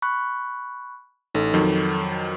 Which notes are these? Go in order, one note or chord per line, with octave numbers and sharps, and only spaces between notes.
B5 C#6 F#6
A1 D#4 A4
F2 D#3 F#3